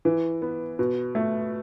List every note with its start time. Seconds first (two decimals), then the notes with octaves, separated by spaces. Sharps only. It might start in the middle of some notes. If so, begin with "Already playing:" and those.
0.05 E3
0.42 B3
0.79 B2
1.15 A3